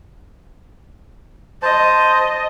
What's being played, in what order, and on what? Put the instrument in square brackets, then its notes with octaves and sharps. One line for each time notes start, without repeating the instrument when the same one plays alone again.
[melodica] C5 A5 [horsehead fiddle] D#5